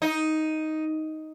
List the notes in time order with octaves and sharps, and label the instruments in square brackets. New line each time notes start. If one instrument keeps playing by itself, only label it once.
[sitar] D#4